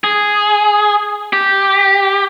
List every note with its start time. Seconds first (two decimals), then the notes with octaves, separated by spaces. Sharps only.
0.04 G#4
1.33 G4